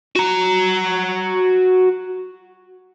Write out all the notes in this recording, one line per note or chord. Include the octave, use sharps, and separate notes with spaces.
F#4 A#5